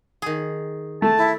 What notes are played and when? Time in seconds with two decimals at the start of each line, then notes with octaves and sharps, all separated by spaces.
0.22 D#3 G#4
1.02 A3 A5
1.17 E4